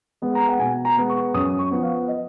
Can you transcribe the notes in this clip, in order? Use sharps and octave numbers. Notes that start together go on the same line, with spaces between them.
G#3 B3
A#5
F#5
B2 G#5
A#5
G#3 B3
C#6
F#2 D#6
C#6
F3 B3
F5
D#5